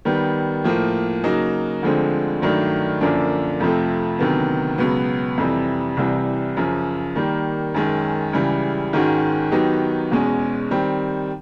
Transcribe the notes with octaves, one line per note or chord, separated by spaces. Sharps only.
D#3 G3 B3
A2 F3 A#3
C#3 F#3 A#3 D#4 F#4
D2 D3 F3 G#3 C4
G2 D#3 F#3 A3 D4
F#2 D3 F3 A#3 D4
F2 C3 F3 A3 C4
D2 C3 D#3 F#3 B3
C#2 B2 F#3 B3
F2 C3 E3 G3
C2 C3 E3 G3
F#2 C#3 F3
D#3 G3 A#3
F#2 D#3 G#3 C#4
C#2 C#3 E3 G3
G#2 D#3 G#3 C#4 F#4
D#3 F#3 B3 D#4 G4
E2 B2 G#3 C#4
D#3 G3 C4